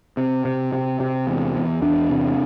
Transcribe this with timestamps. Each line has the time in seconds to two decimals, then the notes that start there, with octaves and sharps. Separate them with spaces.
0.17 C3
0.45 C3
0.73 C3
1.00 C3
1.27 E2
1.55 E2
1.82 E2 D4
2.10 C3